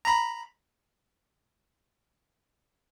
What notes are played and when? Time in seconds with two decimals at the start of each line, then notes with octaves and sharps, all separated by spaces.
0.05 A#5 B5